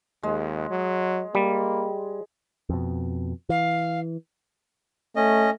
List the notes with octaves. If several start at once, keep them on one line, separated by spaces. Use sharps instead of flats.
D#2 G#3
F#3
G3 A#3
F2 B2
E3 F5
A3 C#4 D#5